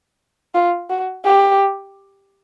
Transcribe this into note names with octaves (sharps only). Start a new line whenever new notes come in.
F4
F#4
G4